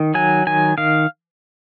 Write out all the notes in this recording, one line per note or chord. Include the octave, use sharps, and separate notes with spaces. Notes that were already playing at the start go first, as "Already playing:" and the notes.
Already playing: D#3
F#3 G#5
D#3 G#5
D#3 F5